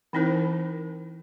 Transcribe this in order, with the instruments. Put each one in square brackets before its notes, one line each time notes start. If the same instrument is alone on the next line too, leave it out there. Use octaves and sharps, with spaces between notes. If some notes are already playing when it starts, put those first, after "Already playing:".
[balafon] E3 C4 D#4 E4 A#4 C5